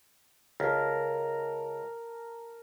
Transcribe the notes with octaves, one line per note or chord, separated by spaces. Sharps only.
C#2 A#4 A5